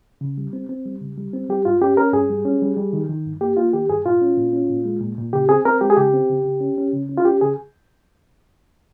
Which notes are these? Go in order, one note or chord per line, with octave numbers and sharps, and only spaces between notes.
C#3
G3
C4
C4
G3
C#3
G3
C4
G3 G4
G2 F4
C#4 G4
C#4 A#4
G2 G#4
G3
C#4
G3
G3
D#3
D#3
G2
A#3 G4
A#3 F4
D#3 G4
G2 G#4
A#2 F4
C#4
A#2
C#4
A#2
G#3
A#2
A#2
C#3 G4
C4 G#4
C4 A#4
G#3 G4
G#4
C#3 G4
C4
C#3
C#3
C#4
C#4
C#3
C#4
F4
C#4 G4
C#3 G#4